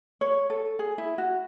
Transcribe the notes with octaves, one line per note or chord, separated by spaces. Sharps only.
C#5
A4
G#4
E4
F#4